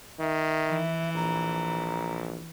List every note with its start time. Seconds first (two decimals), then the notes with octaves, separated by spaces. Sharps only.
0.20 D#3 E5
0.67 E3
1.15 A#1 A#5